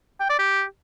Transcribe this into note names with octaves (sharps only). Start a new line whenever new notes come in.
G5
D5
G4